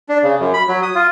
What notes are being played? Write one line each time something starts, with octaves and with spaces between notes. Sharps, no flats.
D4
C#3
F#2
B5
F#3
D#6
F4